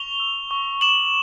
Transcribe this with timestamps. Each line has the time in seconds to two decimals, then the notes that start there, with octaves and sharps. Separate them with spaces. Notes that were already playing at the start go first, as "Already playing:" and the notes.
Already playing: C#6 F7 G7
0.20 E6
0.51 C#6
0.81 D6 E7 F#7